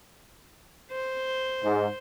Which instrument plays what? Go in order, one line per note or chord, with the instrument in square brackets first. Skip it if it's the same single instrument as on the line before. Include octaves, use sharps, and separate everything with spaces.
[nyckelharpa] C5
[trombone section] G#2